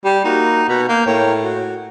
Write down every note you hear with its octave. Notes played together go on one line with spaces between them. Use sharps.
G3 G4
A#3 D#4 F#4
B2 A#5 B5
A#3 G6
A2 A#4 C#5 G5
F#4